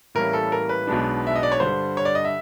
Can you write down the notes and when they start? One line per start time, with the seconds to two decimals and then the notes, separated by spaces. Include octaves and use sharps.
0.15 A2 E3 G3 A#3 C#4 A#4
0.33 A4
0.52 A#4
0.69 B4
0.87 B1 B2 G#3 B3 D4
1.27 E5
1.36 D#5
1.43 D5
1.52 C#5
1.60 G2 D3 G3 C5
1.97 C#5
2.05 D5
2.15 D#5
2.25 E5